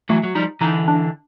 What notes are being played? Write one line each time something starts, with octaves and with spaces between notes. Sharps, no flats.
E3 F#3 A3
F#3
F3 G3 D#4
D3 E3 D#4
D4